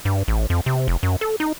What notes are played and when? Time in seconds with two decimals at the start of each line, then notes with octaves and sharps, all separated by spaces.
0.05 G2
0.28 A1
0.50 F2
0.66 C3
0.88 F1
1.03 F#2
1.21 A4
1.40 D#4